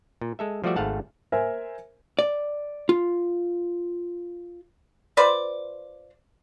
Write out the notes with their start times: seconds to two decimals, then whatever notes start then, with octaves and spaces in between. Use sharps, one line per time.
0.21 A#2
0.39 G#3 A4 E5
0.64 F3 G3 A3 F#4 D5 E5
0.76 G#1 G#2 A3 F5 F#5 A5
1.32 A#4 C5 E5 G#5
2.19 D5
2.89 F4
5.17 F4 B4 C5 D5